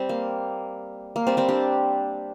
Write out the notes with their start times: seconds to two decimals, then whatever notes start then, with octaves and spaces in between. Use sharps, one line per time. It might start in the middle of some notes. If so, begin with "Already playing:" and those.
Already playing: G3 C4
0.09 A#3
1.16 A#3
1.27 G3 C4
1.37 G3 C4
1.49 D4 G4